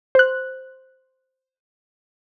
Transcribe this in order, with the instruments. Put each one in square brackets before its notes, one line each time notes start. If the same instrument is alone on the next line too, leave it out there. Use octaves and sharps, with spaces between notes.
[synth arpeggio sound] C5 F#6